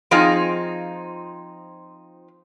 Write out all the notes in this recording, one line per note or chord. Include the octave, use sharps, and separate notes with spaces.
F3 C4 D#4 F4 G#4